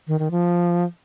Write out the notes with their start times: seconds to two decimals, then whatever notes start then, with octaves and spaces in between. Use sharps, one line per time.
0.08 D#3
0.19 D#3
0.31 F3